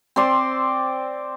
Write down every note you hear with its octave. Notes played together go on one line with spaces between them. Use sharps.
C4 C5 D5 C6